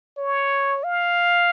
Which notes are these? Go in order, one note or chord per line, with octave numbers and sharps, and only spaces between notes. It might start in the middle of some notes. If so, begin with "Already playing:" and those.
C#5
F5